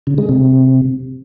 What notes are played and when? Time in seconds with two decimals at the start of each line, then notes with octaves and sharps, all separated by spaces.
0.07 C#3
0.18 G#3
0.29 C3